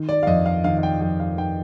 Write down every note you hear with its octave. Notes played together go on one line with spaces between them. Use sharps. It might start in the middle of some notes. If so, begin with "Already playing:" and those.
Already playing: D#3
D5
F5
F2 D#5
F5
D#3 F5
F5
G5
F2 G5
F5
D#3 G5